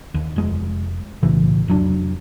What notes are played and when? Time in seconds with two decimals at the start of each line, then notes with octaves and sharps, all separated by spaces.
0.14 D#2
0.36 F1 G#3
1.23 B1 A2 C#3 E3
1.68 F1 F#3 D4